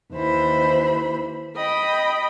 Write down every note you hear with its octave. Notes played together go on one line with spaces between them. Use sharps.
D#2 E3 C5 B5
D#5 G5 B5